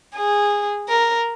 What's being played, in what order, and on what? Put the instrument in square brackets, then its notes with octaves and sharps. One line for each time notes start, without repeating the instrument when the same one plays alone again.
[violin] G#4
A#4